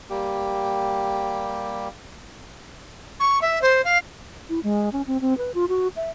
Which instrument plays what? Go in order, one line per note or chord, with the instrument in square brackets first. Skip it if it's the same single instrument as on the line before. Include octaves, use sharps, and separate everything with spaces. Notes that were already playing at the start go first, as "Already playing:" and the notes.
[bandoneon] G3 A#3 G4
[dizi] C#6
E5
C5
F5
[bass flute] E4
G#3
C#4
C4
C4
B4
F4
F#4
E5